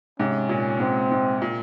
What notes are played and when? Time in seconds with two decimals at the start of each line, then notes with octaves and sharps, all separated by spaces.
0.19 G#2 C3 C#4
0.49 A#2
0.80 G#2 C4
1.12 G#2
1.42 A#2